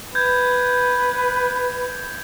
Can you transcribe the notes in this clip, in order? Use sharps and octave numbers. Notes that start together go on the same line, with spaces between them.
B4 G6 G#6